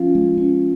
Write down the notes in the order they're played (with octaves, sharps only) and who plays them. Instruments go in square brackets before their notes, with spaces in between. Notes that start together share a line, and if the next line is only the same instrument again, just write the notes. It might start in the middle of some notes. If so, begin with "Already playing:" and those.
Already playing: [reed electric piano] F3 F4 [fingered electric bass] C#4
[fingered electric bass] G#3
C#4